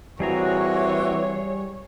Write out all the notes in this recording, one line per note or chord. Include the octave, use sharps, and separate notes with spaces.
A#2 E3 G3 C4 F#4 G#4 C#5 A#5